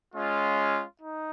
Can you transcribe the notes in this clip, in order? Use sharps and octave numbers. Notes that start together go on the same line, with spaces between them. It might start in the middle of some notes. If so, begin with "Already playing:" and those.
G#3 C#4 F4
D#4